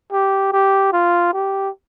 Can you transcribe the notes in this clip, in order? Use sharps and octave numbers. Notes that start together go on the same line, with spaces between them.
G4
G4
F4
G4